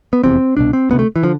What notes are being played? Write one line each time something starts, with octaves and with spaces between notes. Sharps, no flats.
B3
F1 E2 C3 C4
C2 B2 D4
C4
D2 C3 B3
A3
E3
D3 F3